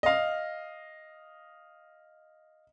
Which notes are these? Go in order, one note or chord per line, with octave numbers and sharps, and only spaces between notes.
D#5 F5